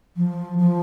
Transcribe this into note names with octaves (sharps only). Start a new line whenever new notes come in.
F3
F3